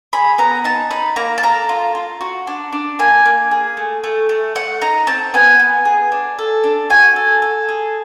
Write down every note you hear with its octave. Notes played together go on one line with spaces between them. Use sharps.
G#4 B5
B3 A#5
D#4 A5
D#4 B5
A#3 A#5
A5
A4 A#5
F4
F4
F#4
D4
D4
A#3 G#5
A#3
G#4
A3
A3
A3
A3 F#5
D#4 A#5
C4 A5
B3 G#5
B3
G#4
D4
A4
D4
F#4 G#5
A4
A4
G#4